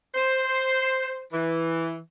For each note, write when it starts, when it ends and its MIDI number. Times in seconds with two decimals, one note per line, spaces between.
0.15 1.22 72
1.32 1.98 52